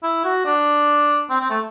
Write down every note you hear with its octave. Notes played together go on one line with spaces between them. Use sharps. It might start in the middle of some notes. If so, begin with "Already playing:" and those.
E4
F#4
D4
C4
C4
A3